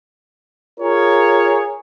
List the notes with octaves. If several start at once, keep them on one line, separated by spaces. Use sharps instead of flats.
F4 G#4 A#4 C#5